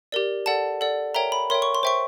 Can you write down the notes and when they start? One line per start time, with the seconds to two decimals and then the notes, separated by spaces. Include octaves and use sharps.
0.12 G4 A#4 D5
0.46 A4 D5 F#5 A5
0.81 A4 D5 F#5
1.15 A#4 C#5 E5 G5 A#5
1.32 B5
1.50 A#4 C#5 E5 G5 C6
1.62 C#6
1.75 C6
1.83 C5 E5 G5 C#6